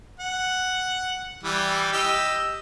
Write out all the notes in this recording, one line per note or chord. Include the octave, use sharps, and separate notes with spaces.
F#5
E3 G3
G4 D#5 E6